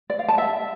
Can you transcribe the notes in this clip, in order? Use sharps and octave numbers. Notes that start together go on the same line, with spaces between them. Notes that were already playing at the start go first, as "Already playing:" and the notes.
D5
F5
A5
E5